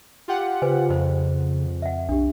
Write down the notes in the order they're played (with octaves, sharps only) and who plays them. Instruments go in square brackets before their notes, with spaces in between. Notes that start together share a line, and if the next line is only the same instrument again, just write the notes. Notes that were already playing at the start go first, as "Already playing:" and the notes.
[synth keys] F4 G4 F#5
[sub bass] C#3 [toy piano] B4 C5 G#5
[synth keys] F2 [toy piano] F4 C5
[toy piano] E5 F#5
[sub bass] B1 [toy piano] D4 G4